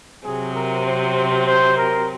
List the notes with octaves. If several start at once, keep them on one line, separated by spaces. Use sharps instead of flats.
C3 F#3 C4 G#4
A#4
C5
C5
A#4